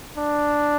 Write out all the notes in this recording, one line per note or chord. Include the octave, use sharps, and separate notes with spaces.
D4